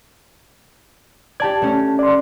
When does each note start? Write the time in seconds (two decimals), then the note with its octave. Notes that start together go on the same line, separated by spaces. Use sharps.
1.40 G4 D5 A5 G#6
1.62 A3 C#4
1.99 D5 C6